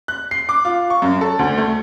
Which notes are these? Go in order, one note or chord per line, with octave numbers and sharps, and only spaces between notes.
F#6
C7
D6
F4
C#6
F#2
A4
D2
A3